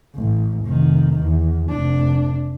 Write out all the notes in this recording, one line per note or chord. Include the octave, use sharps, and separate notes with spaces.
A1
F1 D#3
E2
F1 D4